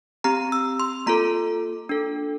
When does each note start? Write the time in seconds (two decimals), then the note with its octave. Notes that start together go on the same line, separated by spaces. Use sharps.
0.24 C4 G4 A#5
0.52 E6
0.80 C6
1.06 A#3 F4 A4 A#5
1.89 D4 A4